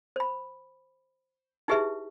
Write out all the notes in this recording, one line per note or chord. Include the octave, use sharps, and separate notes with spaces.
C5 B5
D#4 E4 G4 G#4 B4 E5